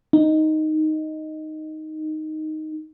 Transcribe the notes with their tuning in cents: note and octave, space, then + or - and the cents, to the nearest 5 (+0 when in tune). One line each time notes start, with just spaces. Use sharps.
D#4 +0